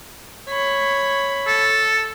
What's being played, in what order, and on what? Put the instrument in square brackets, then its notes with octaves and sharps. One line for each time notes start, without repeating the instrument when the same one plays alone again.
[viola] C#5 B5
[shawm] A4